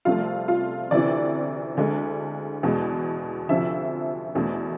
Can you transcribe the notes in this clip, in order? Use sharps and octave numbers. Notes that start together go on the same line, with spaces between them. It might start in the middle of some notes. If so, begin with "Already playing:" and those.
C2 C3 F3 A3 F4
F4
D2 C3 E3 D5
D2 D3 G#3
E2 B2 G#3
D2 C3 F3 E5
E2 B2 A3